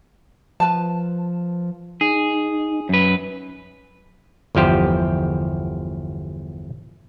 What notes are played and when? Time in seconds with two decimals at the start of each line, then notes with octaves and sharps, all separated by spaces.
0.60 F3 B4 A5
2.01 D#4 G#4
2.89 F#2 B4
4.55 G1 E2 F3 G4 C5